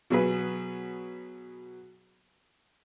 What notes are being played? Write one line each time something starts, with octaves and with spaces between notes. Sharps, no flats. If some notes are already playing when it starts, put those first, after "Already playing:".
B2 F#3 G#4 B4